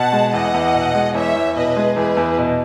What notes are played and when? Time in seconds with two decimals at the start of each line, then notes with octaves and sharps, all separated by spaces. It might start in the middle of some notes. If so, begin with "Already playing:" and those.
Already playing: B2 F#5 A5
0.13 G#3
0.33 E2 D#5 F#5
0.54 E2
0.74 B2
0.95 G#3
1.15 E2 C#5 E5
1.36 E2
1.55 B2 B4 D#5
1.77 G#3
1.96 E2 G#4 B4
2.17 E2
2.38 B2